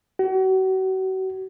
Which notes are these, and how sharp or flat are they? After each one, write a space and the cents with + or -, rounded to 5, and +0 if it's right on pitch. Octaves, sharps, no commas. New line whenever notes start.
F#4 +35